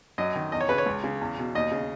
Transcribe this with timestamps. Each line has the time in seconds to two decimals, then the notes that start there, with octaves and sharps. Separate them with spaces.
0.18 F#2 D#5
0.35 D#3
0.52 E2 D#5
0.60 C#5
0.69 C#3 B4
0.78 C#5
0.86 C#2
1.04 C#3
1.21 E2
1.38 B2
1.55 D#2 D#5
1.72 C#3